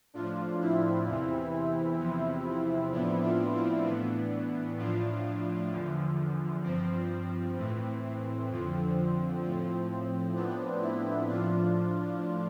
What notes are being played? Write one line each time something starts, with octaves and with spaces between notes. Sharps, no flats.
A2 F3 D4 F4
C4 E4
E2 C3 E3
E2 C3 F3
A2 F3 B3 D4
D4 F4
C4 E4
A2 E3 B3 D4
A2 F3 D4 F4
E2 D3 F3
G2 F3 C4
A2 E3
F2 D3 F3
A2 F3
A2 F3 B3 D4
C4 E4
A2 F3 D4 F4